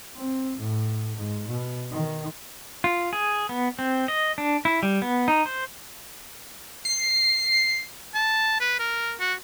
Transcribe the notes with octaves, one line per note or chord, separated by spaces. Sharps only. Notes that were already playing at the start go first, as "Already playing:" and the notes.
C4
A2
G#2
B2
D#3
F4
G#4
B3
C4
D#5
D4
E4
G3
B3
D#4
C5
C7
A5
B4
A#4
F#4